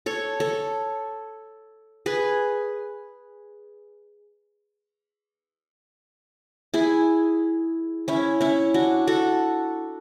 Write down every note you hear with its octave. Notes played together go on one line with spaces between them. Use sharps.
A4 C#5
A4 C#5
G#4 B4
E4 G#4
C#4 E4
C#4 E4
D4 F#4
F#4 A4